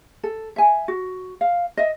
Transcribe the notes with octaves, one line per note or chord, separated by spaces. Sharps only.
A4
E5 G#5
F#4
F5
D#5 E5